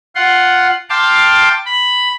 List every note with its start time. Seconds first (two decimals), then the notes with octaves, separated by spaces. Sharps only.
0.15 F4 F#5 C6
0.90 F5 G5 A5 C6 D6
1.66 B5